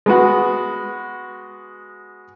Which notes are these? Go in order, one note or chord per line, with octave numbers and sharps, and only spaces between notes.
G#3 B3 F#4